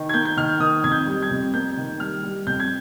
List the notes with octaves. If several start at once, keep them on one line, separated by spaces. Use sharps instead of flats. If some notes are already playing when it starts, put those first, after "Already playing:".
Already playing: D#3
G#6
A#3 G6
G6
D#3 F6
D#3 D#6
F2 G#6
G6
G3
G#6
F2
A#3 G6
D#3
G3 F6
G3
F2 G6
G#6